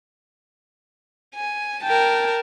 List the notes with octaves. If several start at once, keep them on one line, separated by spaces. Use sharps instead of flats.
G#5
A#4 G5 A5